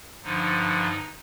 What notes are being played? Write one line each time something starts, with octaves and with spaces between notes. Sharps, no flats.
G2 D3 F3 D#4